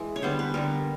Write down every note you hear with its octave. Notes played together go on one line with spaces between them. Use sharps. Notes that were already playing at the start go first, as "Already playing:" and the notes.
Already playing: E3 G#3
C#5
D3 G3 B3 C5
B4
D3 G3 B3 A#4